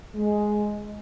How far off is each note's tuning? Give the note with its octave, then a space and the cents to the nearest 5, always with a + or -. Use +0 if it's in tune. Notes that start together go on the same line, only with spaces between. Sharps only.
G#3 +5